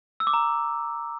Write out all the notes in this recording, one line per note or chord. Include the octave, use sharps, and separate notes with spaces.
E6
D6
A#5